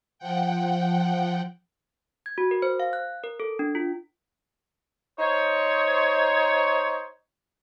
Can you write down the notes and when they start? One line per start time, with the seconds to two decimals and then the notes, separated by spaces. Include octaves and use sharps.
0.19 F3 F#5 G5
2.26 G#6
2.38 F#4
2.51 A#4
2.62 C5
2.80 F5
2.93 F#6
3.24 A#4
3.40 A4
3.59 D4
3.75 F4
5.19 D#4 C5 C#5